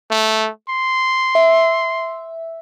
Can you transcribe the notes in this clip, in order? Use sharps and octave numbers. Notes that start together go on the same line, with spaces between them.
A3
C6
E5